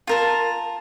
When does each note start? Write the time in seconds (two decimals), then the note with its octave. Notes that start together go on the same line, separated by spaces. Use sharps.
0.07 F4 A#4 A5